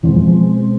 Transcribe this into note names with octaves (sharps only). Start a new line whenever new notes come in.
E2 B2 E3 G#3 C4
F2 F3
F3